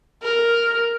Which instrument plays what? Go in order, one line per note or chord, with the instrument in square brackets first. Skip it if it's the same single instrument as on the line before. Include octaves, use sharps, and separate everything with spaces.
[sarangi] A#4